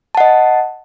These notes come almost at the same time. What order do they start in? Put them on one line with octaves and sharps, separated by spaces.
A5 F#5 D#5